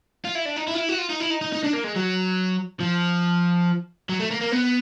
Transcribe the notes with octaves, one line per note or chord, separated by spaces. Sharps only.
F4
E4
D4
D#4
E4
F4
E4
F#4
F4
D#4
E4
D#4
D#4
D#4
D4
A#3
G#3
F#3
F3
F#3
A3
A#3
A#3
B3